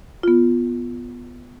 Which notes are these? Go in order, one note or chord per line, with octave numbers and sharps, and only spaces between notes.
B3 F4